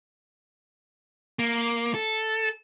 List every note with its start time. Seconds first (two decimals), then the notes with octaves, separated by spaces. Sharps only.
1.39 A#3
1.94 A4